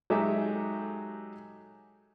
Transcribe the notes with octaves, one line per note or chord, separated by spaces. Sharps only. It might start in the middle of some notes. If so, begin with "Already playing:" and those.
F#3 G#3 D#4 G4 A4 E5